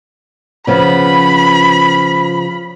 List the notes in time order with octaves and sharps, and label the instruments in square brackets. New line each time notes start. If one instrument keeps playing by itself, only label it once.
[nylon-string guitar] C#3 F3 B3 [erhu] B5